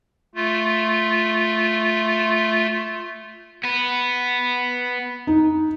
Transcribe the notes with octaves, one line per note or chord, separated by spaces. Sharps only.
A3 F4
B3 B4
D#4